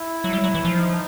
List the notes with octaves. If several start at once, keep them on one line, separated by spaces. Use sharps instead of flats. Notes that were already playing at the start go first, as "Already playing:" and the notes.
Already playing: E4
F#3
G3
F#3
E3
F3
D#4